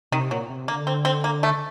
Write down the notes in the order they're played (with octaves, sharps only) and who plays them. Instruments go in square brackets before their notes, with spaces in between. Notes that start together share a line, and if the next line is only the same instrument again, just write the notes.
[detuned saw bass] C3 [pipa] D#3
[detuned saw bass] A#2 [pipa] F#3
[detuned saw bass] C3
[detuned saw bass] D3 [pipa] A#3
[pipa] C4
C4
A#3
A3